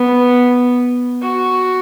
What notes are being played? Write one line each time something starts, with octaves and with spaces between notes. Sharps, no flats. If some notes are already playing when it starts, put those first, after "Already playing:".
Already playing: B3
F#4